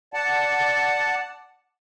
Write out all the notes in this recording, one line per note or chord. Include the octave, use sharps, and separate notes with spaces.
D5 F#5 A5